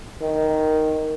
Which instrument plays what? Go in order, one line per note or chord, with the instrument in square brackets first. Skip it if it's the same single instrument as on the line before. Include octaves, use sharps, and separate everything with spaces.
[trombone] D#3